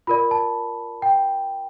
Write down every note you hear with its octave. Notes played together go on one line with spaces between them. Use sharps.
F4 A#4 D5 B5
A5
G5